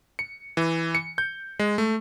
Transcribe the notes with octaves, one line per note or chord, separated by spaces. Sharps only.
C#7
E3
C#7
G6
G#3
A3